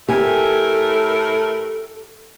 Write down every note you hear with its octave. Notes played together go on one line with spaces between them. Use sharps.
A2 A3 G4 A4 A#4 G#5